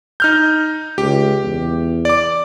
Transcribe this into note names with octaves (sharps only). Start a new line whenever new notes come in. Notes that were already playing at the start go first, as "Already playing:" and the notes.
D#4 F6 G6
C#2 G4
E2
D5 D6